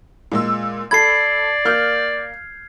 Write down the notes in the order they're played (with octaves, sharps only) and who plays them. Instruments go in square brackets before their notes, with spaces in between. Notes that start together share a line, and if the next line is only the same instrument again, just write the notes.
[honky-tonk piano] A#2 G#3 E6
[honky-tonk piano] A4 B5 [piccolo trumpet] D5 [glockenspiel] G#6 C7
[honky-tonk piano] A#3 F6 G6